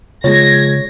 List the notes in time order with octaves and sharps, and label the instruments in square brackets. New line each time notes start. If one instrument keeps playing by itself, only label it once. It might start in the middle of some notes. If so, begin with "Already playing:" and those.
[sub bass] C#3 [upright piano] F3 G#3 [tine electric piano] C#5 [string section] G#6 A#6